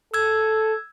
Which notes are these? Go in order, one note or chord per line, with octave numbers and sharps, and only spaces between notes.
A4 E6 G#6